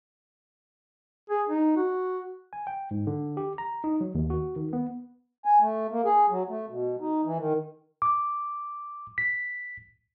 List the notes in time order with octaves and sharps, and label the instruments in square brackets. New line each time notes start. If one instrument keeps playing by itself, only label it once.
[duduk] G#4
D#4
F#4
[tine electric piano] G#5
G5
G#2
D3
G4
A#5
D#4
F#3
D#2
F#4
D#3
B3
[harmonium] G#5
A3
A#3
G#4
F#3
A3
B2
D#4
E3
D#3
[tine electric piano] D6
B6